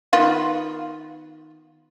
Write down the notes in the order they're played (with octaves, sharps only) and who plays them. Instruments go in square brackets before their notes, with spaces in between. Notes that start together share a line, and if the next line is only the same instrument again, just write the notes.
[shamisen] D#3 B3 F4